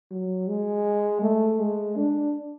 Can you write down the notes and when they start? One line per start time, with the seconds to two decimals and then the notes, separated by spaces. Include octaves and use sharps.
0.11 F#3
0.48 G#3
1.22 A3
1.59 G#3
1.96 D4